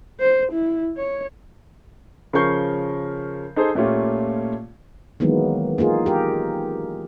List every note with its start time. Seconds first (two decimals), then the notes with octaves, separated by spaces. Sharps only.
0.20 C5
0.52 E4
0.97 C#5
2.33 C#3 F3 A#4 C#6 G6 C7
3.56 D#4 G#4 A4 C5
3.75 A#2 A3 A#3 C#4 F4 G4
5.20 D#3 E3 F#3 G#3 A#3 B3
5.78 A#3 D#4 F4 G#4
6.06 G4 A#4